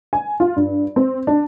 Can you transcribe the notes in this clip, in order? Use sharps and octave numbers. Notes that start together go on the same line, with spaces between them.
G#5
F4
G2
C4
D4